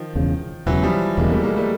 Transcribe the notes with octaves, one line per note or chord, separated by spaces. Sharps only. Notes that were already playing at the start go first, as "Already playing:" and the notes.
Already playing: D#3 F3
E1 E2 C#3
E1 E2 C#3 E3 F#3
F3 G3
E1 E2 C#3 G#3 A#3
G3 A3
G#3 A#3
G3 A3